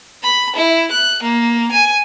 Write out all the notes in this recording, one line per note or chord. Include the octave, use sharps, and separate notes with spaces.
B5
E4
F#6
A#3
G#5